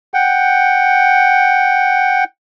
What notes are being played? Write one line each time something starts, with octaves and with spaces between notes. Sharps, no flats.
F#5 G5